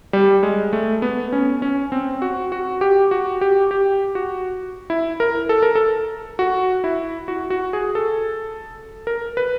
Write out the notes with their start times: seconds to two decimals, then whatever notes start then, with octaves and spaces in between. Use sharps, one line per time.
0.13 G3
0.43 G#3
0.73 A3
1.02 B3
1.32 C#4
1.62 C#4
1.92 C4
2.22 F#4
2.52 F#4
2.81 G4
3.11 F#4
3.41 G4
3.71 G4
4.15 F#4
4.90 E4
5.20 A#4
5.49 A4
5.63 A#4
5.75 A4
6.39 F#4
6.84 E4
7.28 F#4
7.50 F#4
7.73 G#4
7.95 A4
9.07 A#4
9.37 B4